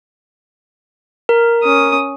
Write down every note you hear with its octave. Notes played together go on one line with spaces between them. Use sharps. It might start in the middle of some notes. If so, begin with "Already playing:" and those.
A#4
C#4 D#6